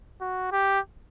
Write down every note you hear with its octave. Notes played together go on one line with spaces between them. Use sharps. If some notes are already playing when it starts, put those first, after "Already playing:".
F#4
G4